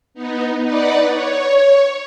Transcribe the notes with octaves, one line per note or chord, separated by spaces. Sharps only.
B3 D#4
D#4 B4 D5 F#5
C#5